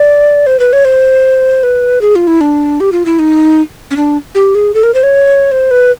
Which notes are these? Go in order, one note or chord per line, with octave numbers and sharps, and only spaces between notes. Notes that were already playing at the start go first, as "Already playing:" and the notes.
Already playing: D5
C5
B4
C#5
C5
B4
G#4
F4
E4
D4
G4
F4
E4
D#4
C#4
D4
G4
G#4
A4
A#4
C5
C#5
C5
B4